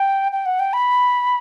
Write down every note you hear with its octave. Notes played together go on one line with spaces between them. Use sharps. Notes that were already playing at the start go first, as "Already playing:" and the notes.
Already playing: G5
G5
F#5
G5
B5